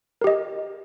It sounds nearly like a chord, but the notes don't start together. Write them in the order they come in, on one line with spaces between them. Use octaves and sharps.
A#4 G4 D#5